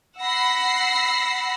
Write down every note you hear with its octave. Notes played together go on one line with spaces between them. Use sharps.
F#5 B5 E6 A#6 C7